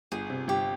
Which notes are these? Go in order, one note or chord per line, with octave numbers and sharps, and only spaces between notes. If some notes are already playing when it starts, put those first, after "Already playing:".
G1 G#4
C3
G1 G4